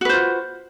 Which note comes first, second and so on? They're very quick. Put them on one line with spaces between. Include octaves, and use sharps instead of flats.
F#4 B4 C5 F4